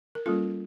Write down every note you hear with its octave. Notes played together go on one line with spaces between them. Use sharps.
A#4
G3 A#3 C#4 F4 A4